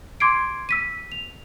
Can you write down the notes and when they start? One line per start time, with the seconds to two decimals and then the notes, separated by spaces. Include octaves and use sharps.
0.20 C6 D6 G#6 C7 D7
0.69 E6 B6 D#7
1.12 F7